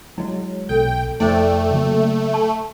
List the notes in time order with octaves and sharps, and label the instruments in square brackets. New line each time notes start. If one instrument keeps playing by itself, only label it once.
[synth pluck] F#3 G#3 [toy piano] E4
[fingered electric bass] B1 [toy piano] A4 [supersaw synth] G5
[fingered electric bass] F1 [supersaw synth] A3 [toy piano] E4 C5 [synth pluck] D5 G5
[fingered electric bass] C#3 F#3 A#3
[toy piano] A5 C#6